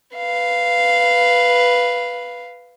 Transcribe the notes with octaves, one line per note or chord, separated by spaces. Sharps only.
B4 F5